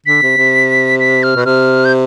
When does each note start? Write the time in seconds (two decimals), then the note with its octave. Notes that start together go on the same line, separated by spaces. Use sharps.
0.06 D3 B6
0.23 C3
0.37 C3
0.99 B6
1.23 F6
1.36 B2
1.45 C3 F6
1.85 G6